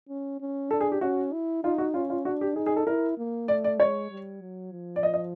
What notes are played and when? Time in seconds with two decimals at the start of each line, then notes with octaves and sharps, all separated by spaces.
0.09 C#4
0.40 C#4
0.71 D4 A4
0.81 G#4
0.92 G4
1.01 C#4 F#4
1.33 E4
1.63 D#4 F4
1.78 F#4
1.94 C#4 F4
2.10 F4
2.25 D4 F#4
2.41 G4
2.56 D#4 G#4
2.66 G#4
2.76 A4
2.87 E4 A#4
3.18 A#3
3.48 A3 D5
3.64 D5
3.80 G#3 C#5
4.11 G3
4.41 F#3
4.72 F3
4.96 D5
5.03 D#5
5.14 D#5